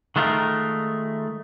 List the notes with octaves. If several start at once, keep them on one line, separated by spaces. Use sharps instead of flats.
D#3 G#3 A3 F4 A#4